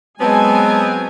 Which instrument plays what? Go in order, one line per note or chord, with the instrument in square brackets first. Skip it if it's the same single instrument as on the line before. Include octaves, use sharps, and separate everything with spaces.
[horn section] F#3 B3 C4 [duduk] G#3 [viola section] G#5 [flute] A5